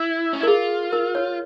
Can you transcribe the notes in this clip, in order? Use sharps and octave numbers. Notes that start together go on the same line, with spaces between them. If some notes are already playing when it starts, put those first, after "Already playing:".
Already playing: E4
C#4
E4
A#4
F4 G#4
A#4
C#5